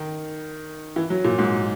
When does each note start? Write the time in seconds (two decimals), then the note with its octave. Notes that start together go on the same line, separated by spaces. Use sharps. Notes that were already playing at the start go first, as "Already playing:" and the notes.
Already playing: D#3
0.96 E3
1.10 F#3
1.24 A#2
1.38 G#2